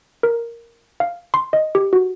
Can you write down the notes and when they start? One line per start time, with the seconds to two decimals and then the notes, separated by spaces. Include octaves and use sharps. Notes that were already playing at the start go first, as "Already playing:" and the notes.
0.23 A#4
1.00 F5
1.34 C6
1.53 D#5
1.75 G4
1.93 F#4